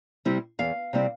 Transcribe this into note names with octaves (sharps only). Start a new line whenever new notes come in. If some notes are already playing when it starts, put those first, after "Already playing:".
C3 G3 C4 E4
E2 F5
C3 G3 C4 E4